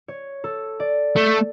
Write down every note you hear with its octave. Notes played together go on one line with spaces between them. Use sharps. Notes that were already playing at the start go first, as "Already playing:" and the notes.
C#5
A4
D5
A3